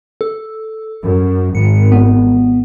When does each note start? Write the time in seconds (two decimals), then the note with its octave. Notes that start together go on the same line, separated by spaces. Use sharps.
0.21 A4
1.01 F#2
1.55 G#1 C#7
1.92 B3